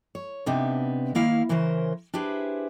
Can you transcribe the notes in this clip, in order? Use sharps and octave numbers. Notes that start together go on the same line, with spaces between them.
C#5
C3 B3 D4 D#4
D#3 A#3 E4 F5
C#3 E3 C#4 A#4 C5
D4 E4 G4 G#4 B4 C5